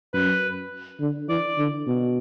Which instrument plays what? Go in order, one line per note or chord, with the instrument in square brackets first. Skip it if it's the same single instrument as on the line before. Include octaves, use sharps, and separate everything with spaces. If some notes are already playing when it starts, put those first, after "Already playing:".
[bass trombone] F#2 [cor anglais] B4
[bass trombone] D3
[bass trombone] E3 [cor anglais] D5
[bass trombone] D3
B2